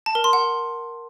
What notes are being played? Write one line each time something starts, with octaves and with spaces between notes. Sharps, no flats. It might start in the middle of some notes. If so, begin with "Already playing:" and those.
A5
A#4
C6
F#5